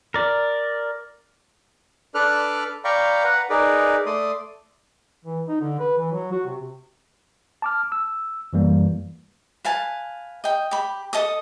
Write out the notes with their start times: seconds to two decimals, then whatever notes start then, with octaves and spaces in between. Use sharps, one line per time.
0.14 A#4 D5
2.15 D4 A4 B4 D5 F6 F#6
2.85 D5 F5 G5 A#5 B5 C#6
3.24 B4 F#5 A#5
3.50 D#4 G#4 A#4 B4 D5
4.06 A3 D5 C6 D#6
5.25 E3
5.48 D#4
5.61 D3
5.80 B4
5.98 E3
6.12 F#3
6.32 F#4
6.46 C3
7.62 A5 D6 F6
7.92 E6
8.53 F#2 E3 G3 A#3
9.65 B4 F5 G#5 A5
10.44 D#5 G5
10.71 G4 B5
11.13 A4 D#5 A5 D#6